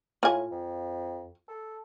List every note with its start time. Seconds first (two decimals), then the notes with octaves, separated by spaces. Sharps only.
0.23 A2 F4 G#5
0.52 F2
1.48 A4